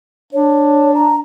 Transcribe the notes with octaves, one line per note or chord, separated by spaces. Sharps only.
D4 C#5
A#5